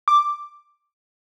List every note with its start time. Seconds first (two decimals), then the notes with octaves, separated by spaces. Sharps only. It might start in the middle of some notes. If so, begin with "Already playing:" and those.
0.08 D6